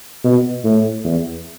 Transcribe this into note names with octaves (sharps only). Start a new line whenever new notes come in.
B2
A2
E2